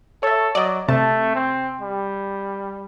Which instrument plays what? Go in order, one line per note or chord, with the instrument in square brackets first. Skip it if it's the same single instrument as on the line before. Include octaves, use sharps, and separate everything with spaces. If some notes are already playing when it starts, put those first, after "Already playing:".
[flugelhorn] A4 [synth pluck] C#5 E5
[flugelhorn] F#3 [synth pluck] D5 D#5
[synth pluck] C3 A5 [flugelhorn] A3
[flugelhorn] C4
G3